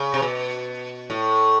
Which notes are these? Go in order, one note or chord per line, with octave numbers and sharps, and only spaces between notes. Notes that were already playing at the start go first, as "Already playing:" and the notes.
Already playing: C#3
C3
B2
A2